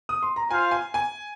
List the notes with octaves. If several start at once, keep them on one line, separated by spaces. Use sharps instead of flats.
D#6
C6
A#5
F4 C5 F5 G#5
G#5
G#5